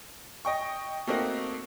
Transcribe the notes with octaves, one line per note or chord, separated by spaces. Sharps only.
D#5 G5 C#6
A3 A#3 C4 D#4 F#4